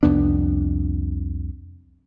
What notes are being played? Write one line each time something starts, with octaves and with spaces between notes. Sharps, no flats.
C2 F2 B3 D4